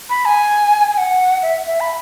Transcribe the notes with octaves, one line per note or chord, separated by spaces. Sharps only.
B5
G#5
G#5
F#5
E5
E5
B5